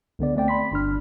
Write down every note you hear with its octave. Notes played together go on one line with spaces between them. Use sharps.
C#2 D3 B3 D5
A3 C4 D5 G5
B5 C6 B6
G1 D4 F6